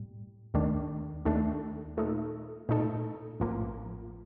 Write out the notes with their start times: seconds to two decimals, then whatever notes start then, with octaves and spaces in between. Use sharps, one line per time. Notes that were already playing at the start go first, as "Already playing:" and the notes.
Already playing: A2 G3
0.54 D#2 D#3 A3 D4
1.25 D#2 D#3 A3 D4
1.97 A#2 A3 D#4 A4
2.69 A#2 A3 D#4 A4
3.40 A1 A2 F3 A#3